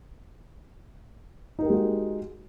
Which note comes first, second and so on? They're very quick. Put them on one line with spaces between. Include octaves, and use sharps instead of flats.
D#4 A#4 G4 G#3 F#4